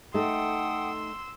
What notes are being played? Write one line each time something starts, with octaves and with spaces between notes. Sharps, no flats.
A3 D#4 A4 F#5 G5 C6 D#6 E6